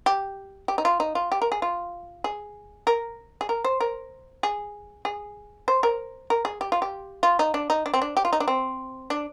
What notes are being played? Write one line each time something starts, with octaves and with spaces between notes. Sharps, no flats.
G4
G4
D#4
F4
D#4
F4
G4
A#4
G#4
F4
G#4
A#4
G#4
A#4
C5
A#4
G#4
G#4
C5
A#4
A#4
G#4
G4
F4
G4
F4
D#4
D4
D#4
D4
C4
D4
G4
F4
D#4
D4
C4
D4